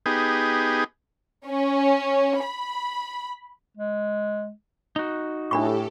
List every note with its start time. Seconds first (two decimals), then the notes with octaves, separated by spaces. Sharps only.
0.06 B3 D#4 G4 G#4
1.48 C#4
2.41 B5
3.77 G#3
4.96 D#4 F#4
5.51 A2 D4 G4 A4 B5 C#6